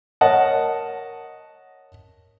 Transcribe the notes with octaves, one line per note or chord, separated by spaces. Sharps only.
A#4 C#5 D#5 F#5 A5